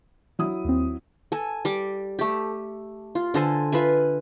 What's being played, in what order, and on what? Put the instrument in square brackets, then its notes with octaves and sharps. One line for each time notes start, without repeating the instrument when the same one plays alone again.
[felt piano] F#3 E4 D#6
[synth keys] D#2 C4
[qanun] A4 G#5
G3 D6
A3 G4
F4
D3 A4 C5 G#5
F4 B4 E5 G#5